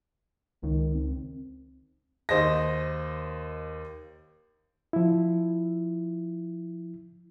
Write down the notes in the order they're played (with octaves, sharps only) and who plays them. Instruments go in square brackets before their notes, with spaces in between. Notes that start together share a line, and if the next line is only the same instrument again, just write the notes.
[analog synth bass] C#2 [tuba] D#3
[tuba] C4
[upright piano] D#2 C5 D#5 A#6
[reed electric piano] F3 E4